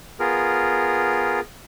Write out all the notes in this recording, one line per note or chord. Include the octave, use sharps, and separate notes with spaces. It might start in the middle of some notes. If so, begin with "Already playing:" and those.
B3 F4 G#4 A#4